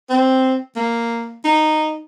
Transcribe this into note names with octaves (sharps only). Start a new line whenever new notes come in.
C4
A#3
D#4